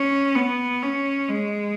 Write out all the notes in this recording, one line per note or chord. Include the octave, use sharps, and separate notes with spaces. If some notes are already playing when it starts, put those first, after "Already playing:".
Already playing: C#4
B3
C#4
G#3